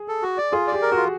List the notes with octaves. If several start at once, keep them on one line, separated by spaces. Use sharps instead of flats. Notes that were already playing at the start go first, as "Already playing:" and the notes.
Already playing: G#4
A4
F#4
D5
F4 G#4
G4 D5
A#4
F4 F#4